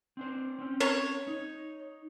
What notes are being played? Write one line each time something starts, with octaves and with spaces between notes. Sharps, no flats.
C4 D4 C5
C4 C#4
C#5
D#4